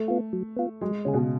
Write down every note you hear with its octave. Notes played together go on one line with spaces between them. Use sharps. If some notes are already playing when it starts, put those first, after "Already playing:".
Already playing: A3
B3 F4
F#3
B3 F4
F#3 G#3
C#3 C#4 G#4
B2
C#3